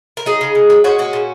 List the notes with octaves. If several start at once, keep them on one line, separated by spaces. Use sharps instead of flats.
A#4
F#3 D#4 G#4
C#3
C#3
F#3
G#3 C#4 F#4
A#2 C#4 F#4
A#2